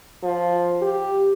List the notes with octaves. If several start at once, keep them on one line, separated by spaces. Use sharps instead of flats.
F3
G4